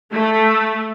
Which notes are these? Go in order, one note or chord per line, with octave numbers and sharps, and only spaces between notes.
A3